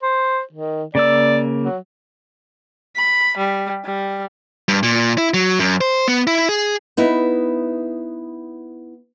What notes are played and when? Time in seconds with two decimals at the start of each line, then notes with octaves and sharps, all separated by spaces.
0.03 C5
0.53 D#3
0.95 C#3 A#3 D5 E6
1.64 F#3
2.96 B5
3.37 G3
3.85 G3
4.68 G2
4.83 A#2
5.18 E4
5.34 F#3
5.59 F#2
5.81 C5
6.08 B3
6.27 E4
6.49 G#4
6.97 B3 D#4 E4